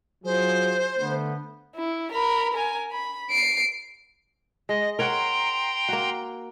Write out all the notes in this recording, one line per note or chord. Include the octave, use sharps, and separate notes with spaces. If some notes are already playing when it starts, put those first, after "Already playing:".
F#3 F4 G#4 C5
D3 A3 B3
E4
A#4 B5
A#4 G#5
B5
C7 D7
G#3 D#5
A#4 C#5 F#5 G5 A#5 C6
A#3 F#4